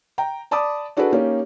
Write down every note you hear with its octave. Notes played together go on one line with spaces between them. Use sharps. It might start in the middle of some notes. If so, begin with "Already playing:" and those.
G5 A#5
D5 A5 B5 D6 D#6
D4 F#4 G#4 A4 B4 D5
A#3 C#4 D#4 G4